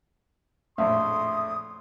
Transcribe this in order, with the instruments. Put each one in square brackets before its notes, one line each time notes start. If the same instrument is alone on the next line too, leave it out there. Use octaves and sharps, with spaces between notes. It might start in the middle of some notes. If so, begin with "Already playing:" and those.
[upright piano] A#1 F2 A2 [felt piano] E5 [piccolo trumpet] C6 [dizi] D#6